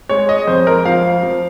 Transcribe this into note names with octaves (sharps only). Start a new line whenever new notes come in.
G#3 C#5
D#5
F2 C5
A#4
F3 F5
F3